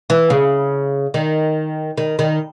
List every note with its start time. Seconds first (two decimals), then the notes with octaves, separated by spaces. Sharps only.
0.10 E3
0.30 C#3
1.14 D#3
1.97 D#3
2.19 D#3